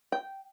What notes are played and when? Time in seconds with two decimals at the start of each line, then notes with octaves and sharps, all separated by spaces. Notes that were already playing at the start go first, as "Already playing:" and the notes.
0.12 G5